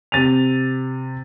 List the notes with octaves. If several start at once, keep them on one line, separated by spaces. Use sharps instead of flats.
C3 A6 D#7 F7